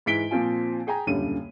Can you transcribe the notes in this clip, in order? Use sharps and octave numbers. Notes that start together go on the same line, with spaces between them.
G#2 E3 B6 D7 G7
A#2 F3 C4 F4 G#5
G#4 G5 G#5 A#5
D#1 C#2 F#2 D3 G3 D#7